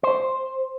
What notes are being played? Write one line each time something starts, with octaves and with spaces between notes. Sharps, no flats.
C5